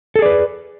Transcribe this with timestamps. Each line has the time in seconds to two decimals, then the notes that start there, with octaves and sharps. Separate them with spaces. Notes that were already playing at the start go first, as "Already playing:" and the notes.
0.16 A4
0.19 G#4
0.22 D5
0.26 B4